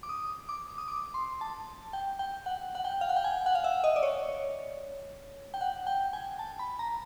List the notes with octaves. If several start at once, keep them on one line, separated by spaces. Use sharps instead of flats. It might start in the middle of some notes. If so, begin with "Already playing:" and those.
D6
D#6
D6
D#6
D6
C6
A5
G5
G5
F#5
F#5
G5
F5
F#5
G5
G#5
F#5
F5
E5
D#5
D5
C#5
G5
F#5
G5
G#5
A5
B5
A#5